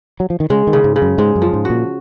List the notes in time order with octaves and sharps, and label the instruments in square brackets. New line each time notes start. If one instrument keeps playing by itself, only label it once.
[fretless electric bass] F#3
F3
D#3
[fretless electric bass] C#3 [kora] G#3
[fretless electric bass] D#3
[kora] C#3
[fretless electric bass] G#2
[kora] C#3
[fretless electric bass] F#2
[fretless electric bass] G#2 [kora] G#3
[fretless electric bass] F#2
[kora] F3
[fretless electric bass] G#2
[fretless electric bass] A#2 [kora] F#4